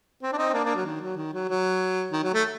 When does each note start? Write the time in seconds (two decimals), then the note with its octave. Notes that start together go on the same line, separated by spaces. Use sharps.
0.22 C4
0.32 D4
0.38 C4 D#4
0.49 C4
0.53 A#3 D4
0.64 A#3 D4
0.75 F#3
0.86 D#3
1.01 F#3
1.17 D#3
1.34 F#3
1.49 F#3
2.12 D#3
2.23 F#3
2.33 A3